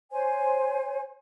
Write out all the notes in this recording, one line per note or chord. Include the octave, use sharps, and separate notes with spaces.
C5 C#5 G#5